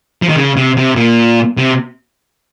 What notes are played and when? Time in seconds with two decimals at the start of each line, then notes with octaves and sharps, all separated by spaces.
0.22 F3
0.29 D#3
0.36 C#3
0.57 C3
0.77 C3
0.96 A#2
1.57 C3